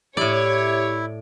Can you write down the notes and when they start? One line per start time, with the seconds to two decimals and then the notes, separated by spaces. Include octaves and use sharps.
0.17 A2 E4 G4 C#5 D5